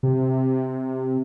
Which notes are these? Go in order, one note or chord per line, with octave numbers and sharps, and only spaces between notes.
C3